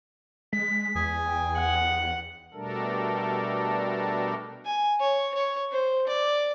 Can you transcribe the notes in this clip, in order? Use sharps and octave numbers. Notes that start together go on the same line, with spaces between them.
G#3 B6
E2 G#4 G#5
G5
F#5
B2 G3 A3 D4 A4 A#4
G#5
C#5
C#5
C5
D5